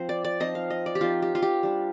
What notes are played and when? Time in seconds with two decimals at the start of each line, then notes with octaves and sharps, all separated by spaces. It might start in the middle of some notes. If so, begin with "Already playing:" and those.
Already playing: F3 C4 C5
0.09 D5
0.24 D5
0.40 F3 C4 D#4 D#5
0.55 F5
0.70 D#5
0.86 D5
0.95 G4
1.01 F3 C4 D#4 F4
1.22 G4
1.35 F4
1.42 G4
1.63 G3 D4